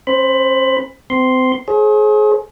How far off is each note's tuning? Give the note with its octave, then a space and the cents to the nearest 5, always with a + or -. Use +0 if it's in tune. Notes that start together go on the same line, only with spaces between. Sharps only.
C#4 -40 C5 +0 B5 +15
C4 -30 C6 +0
G#4 +30 C5 +45